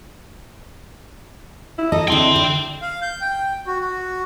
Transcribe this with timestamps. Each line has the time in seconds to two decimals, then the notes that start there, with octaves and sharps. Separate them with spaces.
1.78 E4
1.92 D#4 A4 D#5
2.08 D3 C4 E4 G5 C6
2.36 D3
2.81 F5
3.02 G6
3.21 G5
3.67 F#4
3.80 F#4